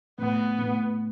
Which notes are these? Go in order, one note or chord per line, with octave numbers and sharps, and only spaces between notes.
A2 B3
A2